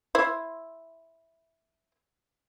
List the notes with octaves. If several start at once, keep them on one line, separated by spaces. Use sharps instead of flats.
E4 C5